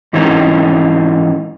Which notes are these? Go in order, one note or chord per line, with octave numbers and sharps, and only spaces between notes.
G#2 E3 C4 C#4 D#4 A#4